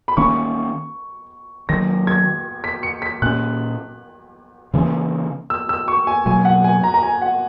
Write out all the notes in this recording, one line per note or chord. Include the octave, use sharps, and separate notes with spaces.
B5
D#3 A#3 C#4 C#6
D#3 F#3 A#3 A#6
G#6
B6
C#7
B6
A#2 A#3 C#4 F#6
C#3 E3 A#3 C#4
E6
E6
C#6
G#5
B2 F#3 A#3 G#5
F#5
G#5
A#5
A#5
G#5
F#5